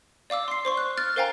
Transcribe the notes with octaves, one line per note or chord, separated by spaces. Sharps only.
D5 F5 D6 E6
C6 C7
C5 C6 C#6
F#6
F6 A6
A#4 C5 F5 G5 G#5 A#5